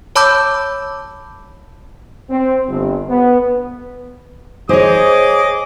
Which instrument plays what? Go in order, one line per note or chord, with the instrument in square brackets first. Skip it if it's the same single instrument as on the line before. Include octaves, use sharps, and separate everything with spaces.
[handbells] C#5 A5 B5 D6 E6 G6
[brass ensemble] C4
G1
B3
[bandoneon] G#4 [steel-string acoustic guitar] C5 C#5 [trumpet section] D#5 D6 D#6